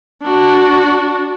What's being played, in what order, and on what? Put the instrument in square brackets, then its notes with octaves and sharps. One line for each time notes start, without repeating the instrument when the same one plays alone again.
[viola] D4 F#4